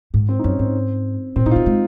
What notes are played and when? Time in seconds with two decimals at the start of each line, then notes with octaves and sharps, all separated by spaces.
0.14 G#2
0.29 C4
0.39 D#4
0.43 F#2 C#4
0.59 G#2 C4
1.36 A#2 C4
1.46 A#2 D#4
1.51 C3 F4
1.66 G#3